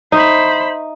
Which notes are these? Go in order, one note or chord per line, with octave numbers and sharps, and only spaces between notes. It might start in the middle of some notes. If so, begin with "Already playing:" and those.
D#4 C5 E5 B5